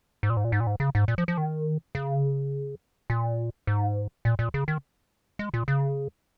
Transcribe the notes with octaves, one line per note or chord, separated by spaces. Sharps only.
G#2
A#2
G#2
A#2
G#2
A#2
G#2
C#3
G#2
A#2
F3
F3
D#3
C#3
A#2
G#2
A#2
A#2
C#3
D#3
G#3
A#2
C#3